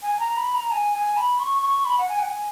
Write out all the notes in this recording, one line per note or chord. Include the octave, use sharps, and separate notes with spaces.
G#5
G#5
A#5
B5
A#5
G#5
G#5
B5
C#6
C#6
B5
F#5
G#5
F#5
G#5